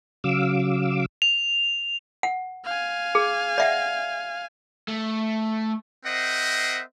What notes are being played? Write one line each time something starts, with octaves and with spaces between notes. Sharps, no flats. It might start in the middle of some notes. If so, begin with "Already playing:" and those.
C#3 F#3 F5 D6 E6
F7
F#5
F5 G#5
G#4
D5 E5 F#5
A3
C4 A#4 C5 D#5 E5 F#5